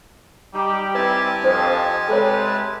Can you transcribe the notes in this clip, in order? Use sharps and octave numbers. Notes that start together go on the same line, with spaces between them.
G3 D#4 G4
C4 E4 G4 B4 G#5 A5
F2 D4 C5 D#5
C3 G#3 A4 B4 C#5